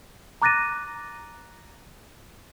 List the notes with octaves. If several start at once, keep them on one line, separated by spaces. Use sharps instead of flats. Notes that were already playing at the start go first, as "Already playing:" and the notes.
A#5 D6 F#6 A6 A#6 D#7